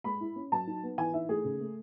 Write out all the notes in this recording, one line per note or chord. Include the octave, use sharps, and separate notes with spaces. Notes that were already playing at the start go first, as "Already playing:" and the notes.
G#3 B5
E4
C#4
F#3 A5
D#4
B3
E3 G#5
D#4 E5
A3 G#4
C#3
A3